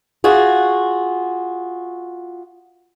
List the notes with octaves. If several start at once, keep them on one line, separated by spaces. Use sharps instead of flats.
F4 F#4 G#4